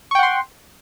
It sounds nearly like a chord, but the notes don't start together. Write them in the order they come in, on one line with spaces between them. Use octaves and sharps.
C#6 G5 F#5 C6